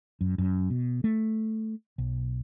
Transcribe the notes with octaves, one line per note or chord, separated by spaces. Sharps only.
F#2
F#2
B2
A3
B1